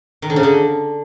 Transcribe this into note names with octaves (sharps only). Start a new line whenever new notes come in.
D#3
D3
C#3
D3